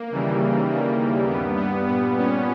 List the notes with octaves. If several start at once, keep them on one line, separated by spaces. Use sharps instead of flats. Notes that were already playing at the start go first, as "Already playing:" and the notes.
Already playing: A#3
D#2 C#3 E3 G3
D#2 C#3 E3 G3
G2 G3 B3
B3
A#2 G3 B3
C#4